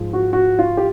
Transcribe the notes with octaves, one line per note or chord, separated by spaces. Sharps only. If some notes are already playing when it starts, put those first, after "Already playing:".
Already playing: G#2 F3 G#3
F#4
F#4
F4
G4